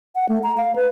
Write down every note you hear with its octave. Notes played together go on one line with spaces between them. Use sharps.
F#5
A3
A#5
F5
B4